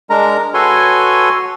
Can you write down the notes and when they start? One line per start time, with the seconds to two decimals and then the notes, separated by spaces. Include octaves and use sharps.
0.10 G#3 D4 A#4 A#5
0.54 F#4 A4 B4 C#5 G#5 C6